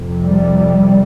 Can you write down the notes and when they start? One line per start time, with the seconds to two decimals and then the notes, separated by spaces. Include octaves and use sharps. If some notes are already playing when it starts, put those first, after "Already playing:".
Already playing: F2 C3
0.24 G3